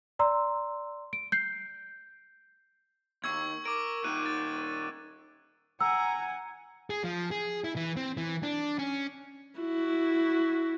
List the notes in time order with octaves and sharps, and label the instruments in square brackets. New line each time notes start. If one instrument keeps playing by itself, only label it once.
[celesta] D5 A#5 C6 E6
D7
G6 C7
[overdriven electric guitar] D#2 [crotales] C#6 E6 G#6
[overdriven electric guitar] A#4 [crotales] D6 D7
[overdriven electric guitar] A#2 D#3 [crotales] F#6 D#7
[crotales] A6
[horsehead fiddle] F#5 G#5 [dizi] A#5 [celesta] E6
[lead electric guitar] G#4
F3
G#4
E4
E3
C4
E3
D4
C#4
[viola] E4 F#4